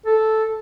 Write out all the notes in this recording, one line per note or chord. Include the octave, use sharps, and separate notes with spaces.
A4